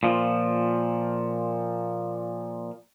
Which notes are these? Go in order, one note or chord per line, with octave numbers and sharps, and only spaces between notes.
A#2 F3